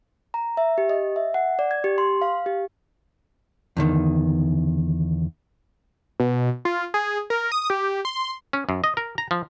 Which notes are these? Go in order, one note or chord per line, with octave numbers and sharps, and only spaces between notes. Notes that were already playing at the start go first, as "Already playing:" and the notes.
A#5
E5
G4
D#5
E5
F#5
D5
G#6
G4
C6
F5
G4
E2 D3 D#3
B2
F4
G#4
A#4
D#6
G4
C6
C#4
F#2
D#5
A#4
A#5
F3